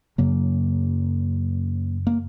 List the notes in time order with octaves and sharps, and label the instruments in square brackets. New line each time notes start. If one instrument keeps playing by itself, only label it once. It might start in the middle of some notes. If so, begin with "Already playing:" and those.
[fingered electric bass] F#2 C#3 F#3 A#3
A#3